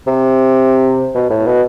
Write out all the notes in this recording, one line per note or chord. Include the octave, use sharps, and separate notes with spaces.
C3
B2
A2
B2